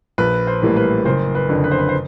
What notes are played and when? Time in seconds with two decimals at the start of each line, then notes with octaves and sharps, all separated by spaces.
0.18 A#1 B4
0.47 C5
0.62 A2 E3 G3 A#3
0.76 B4
1.05 F#1 C5
1.35 B4
1.49 F2 D3
1.64 B4
1.71 C5
1.78 B4
1.89 C5